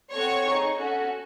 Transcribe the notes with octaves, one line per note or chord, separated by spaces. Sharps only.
C4 F#4 A4 C#5 C#6
D#4 G#4
C#4 F#4 A4